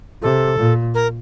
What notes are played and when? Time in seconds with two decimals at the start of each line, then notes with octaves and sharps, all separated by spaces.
0.22 C3 A4
0.58 A#2
0.95 A#4